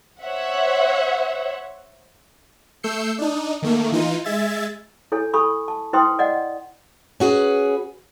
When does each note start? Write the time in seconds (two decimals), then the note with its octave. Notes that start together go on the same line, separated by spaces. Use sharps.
0.22 C5 C#5 E5 F#5
2.83 A3 E6 G6 C7 C#7
3.18 D4 D#4
3.62 D#3 A3 A#3
3.92 E3 D#4 F4
4.24 G#3 E5 G#6 A6
5.12 E4 A4 C#5 G#5
5.34 A4 G#5 B5 C#6 D#6
5.68 A5
5.93 E4 B4 C5 G5 C6 D#6
6.19 D5 D#5 F#5
7.20 C#4 F#4 G#4 B4